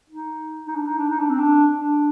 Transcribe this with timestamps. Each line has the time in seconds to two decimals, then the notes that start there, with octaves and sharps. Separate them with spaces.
0.10 D#4
0.67 D#4
0.75 D4
0.86 D#4
0.98 D4
1.10 D#4
1.19 D4
1.30 C4
1.39 D4
1.76 D4